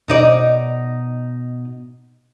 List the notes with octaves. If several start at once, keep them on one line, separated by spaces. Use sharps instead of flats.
B2 D#4 D5